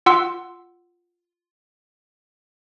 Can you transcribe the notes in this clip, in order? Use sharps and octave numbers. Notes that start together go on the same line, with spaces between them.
F4 F#5 C6 E6